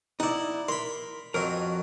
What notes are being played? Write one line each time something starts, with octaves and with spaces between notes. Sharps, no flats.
D#4 E4 D5 F#5
A#4 B5 C6
F2 F#3 A#4 D#5